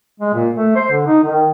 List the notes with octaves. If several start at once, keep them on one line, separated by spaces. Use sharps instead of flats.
G#3
A#2
A3
C5
D3
D#4
D#3